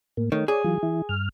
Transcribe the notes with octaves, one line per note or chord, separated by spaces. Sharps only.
A2 A#3
D#3 A3 C#5
G#4 C#5 D5
E3 F#3 F4
E3 E4
G2 F6